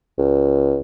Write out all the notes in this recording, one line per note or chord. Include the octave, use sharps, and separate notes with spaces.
C#2